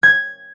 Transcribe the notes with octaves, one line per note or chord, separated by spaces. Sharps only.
G#6